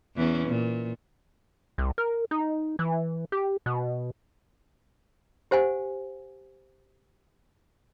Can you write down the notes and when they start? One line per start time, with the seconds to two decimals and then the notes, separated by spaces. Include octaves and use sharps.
0.16 E2 E3 C#4
0.47 A#2
1.78 C2
1.98 A#4
2.31 D#4
2.79 E3
3.32 G4
3.66 B2
5.51 G4 C5 F#5 G#5